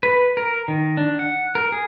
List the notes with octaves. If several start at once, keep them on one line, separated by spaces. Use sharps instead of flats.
B4
A#4
D#3
D4
F#5
A#4
G#4